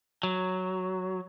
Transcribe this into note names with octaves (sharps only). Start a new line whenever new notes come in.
F#3